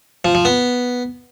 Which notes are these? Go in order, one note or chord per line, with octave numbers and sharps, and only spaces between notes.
F3
F3
B3